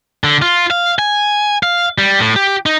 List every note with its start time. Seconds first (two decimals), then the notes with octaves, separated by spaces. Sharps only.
0.24 D3
0.42 F4
0.71 F5
0.99 G#5
1.63 F5
1.98 G3
2.19 A2
2.36 G4
2.66 D#4